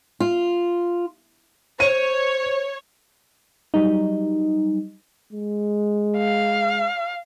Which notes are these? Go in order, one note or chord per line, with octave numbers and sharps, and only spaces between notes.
F4
C5 C#5 D#7
F#3 G3 D#4
G#3
F5